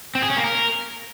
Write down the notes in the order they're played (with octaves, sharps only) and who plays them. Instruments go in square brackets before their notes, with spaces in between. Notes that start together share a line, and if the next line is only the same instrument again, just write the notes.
[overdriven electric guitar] C4
G#4
C#4
A#3
A#4